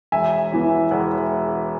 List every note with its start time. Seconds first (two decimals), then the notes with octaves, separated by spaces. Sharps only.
0.12 E1 E5 G#5
0.52 E2 E3 B3
0.91 E1 C#5 F#5